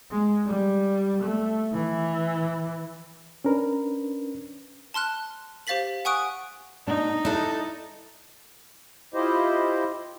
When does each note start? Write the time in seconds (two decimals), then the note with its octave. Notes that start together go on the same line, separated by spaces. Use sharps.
0.11 G#3
0.46 G3
1.23 A3
1.73 E3
3.44 C#4 D4 A#4 B4
4.94 A5 C6 F6 F#6
5.67 G4 C5 F5 A6 B6 F#7
6.05 F#5 G#5 C#6 D#6 F#6 D7
6.87 B2 A3 D4 D#4
7.25 D4 E4 A4
9.14 E4 F4 G4 C5 D#5